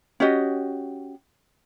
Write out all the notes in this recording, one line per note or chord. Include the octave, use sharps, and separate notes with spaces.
C#4 F#4 G4 D#5